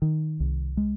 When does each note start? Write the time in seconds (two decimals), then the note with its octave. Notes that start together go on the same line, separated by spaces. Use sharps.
0.02 D#3
0.40 C2
0.77 G#3